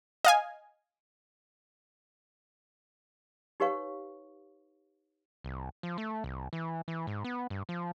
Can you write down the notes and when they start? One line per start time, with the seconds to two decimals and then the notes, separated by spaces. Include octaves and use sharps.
0.25 D#5 F5 G#5
3.60 D#4 G4 B4 C#5 F5 C#6
5.44 C2
5.83 F3
5.98 A3
6.24 C2
6.53 E3
6.88 E3
7.07 G#2
7.24 B3
7.50 G2
7.69 F3